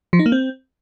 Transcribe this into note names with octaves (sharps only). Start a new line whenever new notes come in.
F3
D#4
A#3
C4